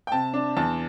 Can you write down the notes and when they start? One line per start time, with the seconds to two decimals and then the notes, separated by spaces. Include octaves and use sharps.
0.07 G5
0.12 C3 A5
0.33 D4
0.57 E2 A5